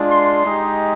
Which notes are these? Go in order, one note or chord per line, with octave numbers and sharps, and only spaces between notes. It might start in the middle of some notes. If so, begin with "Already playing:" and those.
Already playing: G#3 D4 F4
C6
G#3 D#4 G4